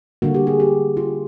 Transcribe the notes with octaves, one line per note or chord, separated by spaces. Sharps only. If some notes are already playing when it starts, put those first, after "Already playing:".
D3 G3 A#3 F#4
G4
G#4
G4
F4